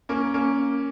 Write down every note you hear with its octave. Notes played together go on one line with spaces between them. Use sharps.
A#3 C#4
A#3 C#4